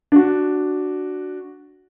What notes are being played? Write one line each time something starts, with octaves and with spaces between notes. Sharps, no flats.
D4 F#4